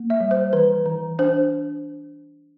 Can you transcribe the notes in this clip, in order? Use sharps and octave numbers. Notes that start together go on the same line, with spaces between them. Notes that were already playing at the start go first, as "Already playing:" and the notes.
Already playing: A#3
E5
G3
C5
E3 B4
E3
D4 C5